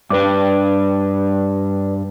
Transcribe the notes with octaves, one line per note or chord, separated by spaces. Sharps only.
G2 D4 B4 D5 D6